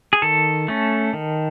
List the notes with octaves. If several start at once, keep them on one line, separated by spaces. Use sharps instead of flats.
G#4
D#3 A4
A3 C#4
D#3